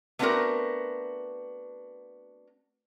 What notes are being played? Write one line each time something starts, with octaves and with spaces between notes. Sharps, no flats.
A3 B3 C4 D4 F#4 A#4